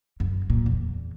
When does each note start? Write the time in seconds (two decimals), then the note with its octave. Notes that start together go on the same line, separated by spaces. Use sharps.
0.20 F#2
0.50 A#2
0.66 E2